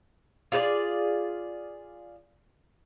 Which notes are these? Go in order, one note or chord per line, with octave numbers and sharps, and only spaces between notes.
F4 G#4 C5 D5